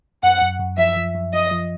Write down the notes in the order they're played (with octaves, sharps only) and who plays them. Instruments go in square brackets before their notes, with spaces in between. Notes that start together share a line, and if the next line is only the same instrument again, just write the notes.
[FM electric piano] F#2 [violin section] F#5
[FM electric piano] F#2
F#2
[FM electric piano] F3 [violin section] E5
[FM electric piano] F3
F#2
[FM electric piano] F3 [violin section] D#5
[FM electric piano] F3